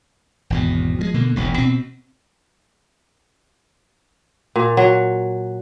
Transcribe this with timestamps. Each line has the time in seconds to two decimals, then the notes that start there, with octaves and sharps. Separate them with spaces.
0.50 G#1 E2 B2
0.99 F3 F#3 G#3
1.14 B2 D3 A#3
1.36 E1 B1 A2
1.58 B2 C4
4.56 A#2
4.77 F#3